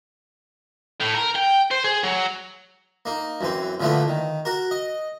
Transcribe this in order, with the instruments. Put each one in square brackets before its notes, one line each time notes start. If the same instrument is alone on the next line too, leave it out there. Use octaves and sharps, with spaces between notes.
[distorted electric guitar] A2
A#4
G5
C5
G#4
F#3
[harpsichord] A#3 D#4
F#2 E3 C4
A#2 D3 F3 A3 B3 E4
D#3
F#4 A#4
D#5